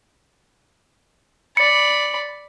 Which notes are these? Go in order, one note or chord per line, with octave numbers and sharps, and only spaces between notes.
D5 B5 C#7